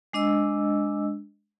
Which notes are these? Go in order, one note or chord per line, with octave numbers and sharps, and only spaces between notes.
G#3 D4 D#5 E6